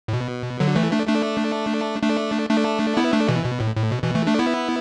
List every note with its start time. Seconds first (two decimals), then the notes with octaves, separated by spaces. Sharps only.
0.08 A2
0.13 B2
0.60 D3 F#3
0.76 E3 A3
0.92 A3 D4
1.07 A3 D4
2.02 A3 D4
2.50 A3 D4
2.97 B3 E4
3.13 A3 D4
3.28 B2 E3
3.44 B2
3.60 A2
3.76 A2
3.92 B2
4.03 B2 E3
4.15 E3 A3
4.27 A3 D4
4.39 B3 E4